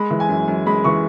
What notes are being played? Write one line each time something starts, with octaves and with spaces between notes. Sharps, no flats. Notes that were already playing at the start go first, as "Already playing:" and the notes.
Already playing: G#3 B5
E3
G#5
F#2
F#2
G#3 B5
E3 C#6